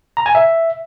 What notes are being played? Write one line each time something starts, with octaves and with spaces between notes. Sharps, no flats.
A#5
G#5
E5